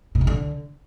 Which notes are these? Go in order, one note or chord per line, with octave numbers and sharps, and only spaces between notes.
A#2
B2
D3